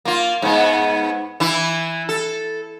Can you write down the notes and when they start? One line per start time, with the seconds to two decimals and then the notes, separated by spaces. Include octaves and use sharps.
0.05 A#3 F4
0.42 G#2 B3
1.40 E3 E4
2.09 A4